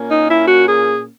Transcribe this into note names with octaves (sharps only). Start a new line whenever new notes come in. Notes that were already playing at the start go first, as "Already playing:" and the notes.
Already playing: A#2 A#3 C#4
D#4
E4
F#4
G#4